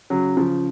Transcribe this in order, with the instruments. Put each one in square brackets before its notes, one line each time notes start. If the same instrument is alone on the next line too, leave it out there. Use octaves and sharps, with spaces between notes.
[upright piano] C#3 F#3
C#3 F3